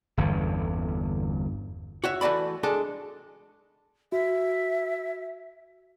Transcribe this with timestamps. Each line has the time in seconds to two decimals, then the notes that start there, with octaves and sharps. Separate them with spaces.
0.17 G1 E2 G2 D3
2.04 F#4 C#5 E5
2.21 E3 A3 F#4 D5 B5
2.63 G#3 D4 A4
4.12 F#4 E5